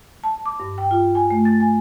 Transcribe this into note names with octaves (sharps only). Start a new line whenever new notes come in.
A5
D6
G2
G5
F4
G#5
A3
A6
G#5